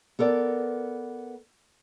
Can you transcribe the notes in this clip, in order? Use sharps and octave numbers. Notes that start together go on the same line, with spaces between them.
B3 A4 A#4 D5